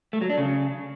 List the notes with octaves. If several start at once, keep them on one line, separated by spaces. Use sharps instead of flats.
A3
F#3
D4
C#3